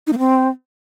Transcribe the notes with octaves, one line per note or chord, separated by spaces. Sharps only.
D#4
A#3
C4